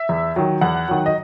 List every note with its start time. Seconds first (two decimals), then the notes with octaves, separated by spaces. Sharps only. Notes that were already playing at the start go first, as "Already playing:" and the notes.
Already playing: E5
0.09 E2
0.36 D#3 F#3
0.61 E2 F#5
0.88 D#3 F#3
1.06 D#5